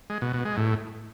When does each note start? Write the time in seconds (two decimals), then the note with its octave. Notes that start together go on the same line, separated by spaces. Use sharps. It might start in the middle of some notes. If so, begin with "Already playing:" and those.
0.10 G#3
0.22 B2
0.33 B2
0.45 G#3
0.57 A2